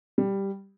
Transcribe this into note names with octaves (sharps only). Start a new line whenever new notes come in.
G3